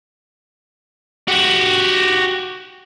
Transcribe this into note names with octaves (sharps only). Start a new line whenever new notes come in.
F#4 G4